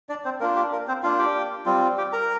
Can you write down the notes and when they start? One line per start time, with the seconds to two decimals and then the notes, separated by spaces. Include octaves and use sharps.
0.09 D4 D5
0.25 C4 C5
0.40 A#3 D4 F4 A#4
0.56 G4
0.72 A#4
0.88 C4 C5
1.03 A#3 D4 F4 F5
1.19 G4 G5
1.66 G3 C4 F4
1.98 G4 G5
2.13 A#4 A#5